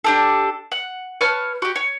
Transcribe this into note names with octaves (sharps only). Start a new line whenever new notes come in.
D4 G4 A4
F#5
B4 C#5 A5 F6
F#4 G4
C#5